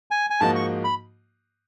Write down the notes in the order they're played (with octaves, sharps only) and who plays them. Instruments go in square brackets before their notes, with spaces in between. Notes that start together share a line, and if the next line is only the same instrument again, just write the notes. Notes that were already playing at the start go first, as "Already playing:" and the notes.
[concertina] G#5
G#5
[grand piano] G#2 F3 A#3 D#4 F#4 [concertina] A5
[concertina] C#6
B5